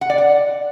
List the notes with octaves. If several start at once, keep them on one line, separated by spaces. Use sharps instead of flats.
F#5
D5
F#5